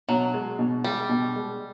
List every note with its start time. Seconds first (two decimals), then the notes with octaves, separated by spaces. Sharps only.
0.09 B2 F#3
0.34 G#3
0.59 B2
0.84 G3 G#3
1.09 B2
1.36 G#3